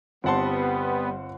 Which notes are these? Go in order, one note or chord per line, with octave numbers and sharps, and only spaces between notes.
G1 G3 B3 C4 F#5 A5 C6